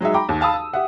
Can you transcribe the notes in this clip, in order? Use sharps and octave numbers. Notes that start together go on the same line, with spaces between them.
F#3 G#3 D#4 E5
G5 A#5 B5 D6
D#2
F5 A5 B5 D#6 E6
E6
G4 E5 F#5